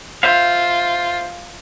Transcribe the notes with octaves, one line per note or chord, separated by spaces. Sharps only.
F4 C5 E5 F5